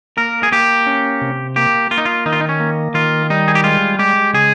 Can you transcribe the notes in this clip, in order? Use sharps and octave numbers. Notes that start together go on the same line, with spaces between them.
A#3 A#4
G#4
A#3 G4
C#4
C3
A#3 G4
A#3 F4
D#4
F4
D#3 D#4
F4
D#4
C#4
A#3
D#3 F4
G3 D#4
G#4
G4
G#3 F4
G#3 G4
C#3 G#4